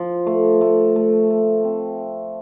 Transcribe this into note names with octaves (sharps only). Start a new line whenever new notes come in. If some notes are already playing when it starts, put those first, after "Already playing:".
Already playing: F3
A3
A3
A3
A3
C4